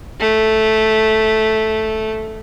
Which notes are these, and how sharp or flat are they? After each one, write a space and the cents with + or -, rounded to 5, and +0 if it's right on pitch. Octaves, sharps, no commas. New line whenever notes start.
A3 -5